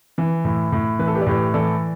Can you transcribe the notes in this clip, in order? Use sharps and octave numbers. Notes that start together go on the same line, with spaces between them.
E3
A2
A2
E3 B4
A4
G4 B4
D5
A2 G4 B4
E3 A4 D5